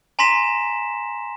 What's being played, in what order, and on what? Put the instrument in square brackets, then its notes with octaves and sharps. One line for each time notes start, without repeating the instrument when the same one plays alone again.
[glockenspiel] G#5 A#5 C6 A#6 B6 E7